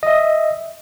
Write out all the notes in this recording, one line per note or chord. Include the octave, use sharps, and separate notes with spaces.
D#5 E5